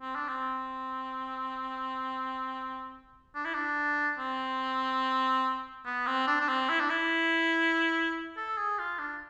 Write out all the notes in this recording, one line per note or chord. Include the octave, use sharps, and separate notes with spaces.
C4
D4
C4
D4
E4
D4
C4
B3
C4
D4
D4
C4
E4
D4
E4
A4
G#4
F4
D4